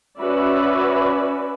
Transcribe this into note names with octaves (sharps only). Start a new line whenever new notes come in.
C#4 F#4 B4 D5 E5